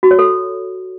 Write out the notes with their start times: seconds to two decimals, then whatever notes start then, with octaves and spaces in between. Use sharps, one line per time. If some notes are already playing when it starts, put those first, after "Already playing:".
0.03 F#4
0.11 C#5
0.19 A4